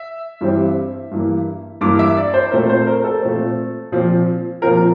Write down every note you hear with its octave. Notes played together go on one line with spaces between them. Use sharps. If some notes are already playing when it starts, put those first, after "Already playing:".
Already playing: E5
G2 E3 G3 C4
G2 E3 A#3
G2 E3 A#3 D6
E5
D5
C5
A#2 A3 C4 A#4
C5
A#4
A4
A#2 A3 C4
A#2 F3 C4
A#2 F3 C4 A#4